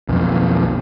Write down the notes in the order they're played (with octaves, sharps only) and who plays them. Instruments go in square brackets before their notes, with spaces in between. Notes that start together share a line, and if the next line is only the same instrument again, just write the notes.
[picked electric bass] B1 F2